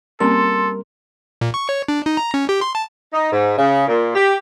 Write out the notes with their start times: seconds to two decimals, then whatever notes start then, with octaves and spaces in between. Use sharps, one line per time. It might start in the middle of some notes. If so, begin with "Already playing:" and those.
0.20 G3 A#3 C4 C#4 A4 A#4 C6
1.41 A#2
1.54 C#6
1.69 C#5
1.88 D4
2.06 D#4
2.17 A#5
2.34 C#4
2.49 G4
2.61 C6
2.75 A5
3.13 D#4
3.32 G#2
3.58 C#3
3.88 A#2
4.15 G4